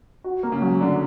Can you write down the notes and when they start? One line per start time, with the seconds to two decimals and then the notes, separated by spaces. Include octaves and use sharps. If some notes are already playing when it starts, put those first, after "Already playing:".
0.24 F#4
0.43 A#3
0.52 C#3
0.62 F#3
0.81 D3 D4